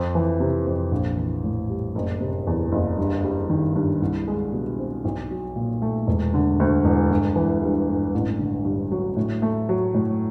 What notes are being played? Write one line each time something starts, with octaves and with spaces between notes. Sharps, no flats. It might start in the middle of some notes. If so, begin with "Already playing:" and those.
Already playing: F2
E3
C3
F2
A#1
E3
A2
G3
F#1
C3
E2
F#1
G2
G3
D#3
G2
C2
G#3
B2
C4
B1
F#3
A#2
A3
E1
D3
D2
E1
G1
E3
G2
G1
A1
D3
G2
F#3
A2
A3
F#3
A2